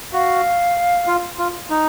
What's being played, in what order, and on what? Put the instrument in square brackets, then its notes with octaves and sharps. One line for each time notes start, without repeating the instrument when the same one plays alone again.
[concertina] F#4 [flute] F5
[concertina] F4
F4
D#4